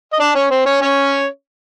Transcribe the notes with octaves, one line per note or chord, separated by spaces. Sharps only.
D#5
D4 D5
C#4 C#5
C4 C5
C#4 C#5
C#4 C#5